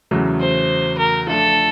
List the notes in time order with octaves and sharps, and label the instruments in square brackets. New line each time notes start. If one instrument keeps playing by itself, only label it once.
[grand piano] E2 C#3 F#3 A3
[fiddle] C5
A#4
[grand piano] F3 A3 D4 F4 [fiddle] A4